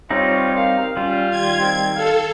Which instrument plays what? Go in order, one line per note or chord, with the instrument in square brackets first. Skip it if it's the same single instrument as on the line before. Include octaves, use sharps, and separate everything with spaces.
[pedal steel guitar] G3 C4 D#4 [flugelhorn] F4 [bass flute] C#5
[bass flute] A#4 [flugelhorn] F5
[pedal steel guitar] G3 [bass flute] C#4 [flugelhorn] F4
[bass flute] D#3 [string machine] G#6
[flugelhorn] C4
[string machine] A4 [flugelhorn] F5